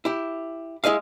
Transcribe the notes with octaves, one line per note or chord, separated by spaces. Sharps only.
E4 G4
G#3 E4 D#5 F5